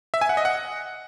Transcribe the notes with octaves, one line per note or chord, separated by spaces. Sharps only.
E5
G#5
F#5
D#5
F#5